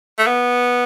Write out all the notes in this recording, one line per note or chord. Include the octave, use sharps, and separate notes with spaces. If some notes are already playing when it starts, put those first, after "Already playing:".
A3
B3